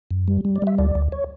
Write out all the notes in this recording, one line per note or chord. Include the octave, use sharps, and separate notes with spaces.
F#2
G3
G3
D5
G3 E5
D2 D5
D2
C#5